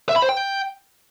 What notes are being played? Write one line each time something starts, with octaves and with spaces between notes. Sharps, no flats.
E5
B5
C5
G5